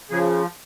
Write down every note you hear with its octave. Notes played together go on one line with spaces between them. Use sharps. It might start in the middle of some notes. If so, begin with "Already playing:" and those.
C#3 F3 G#4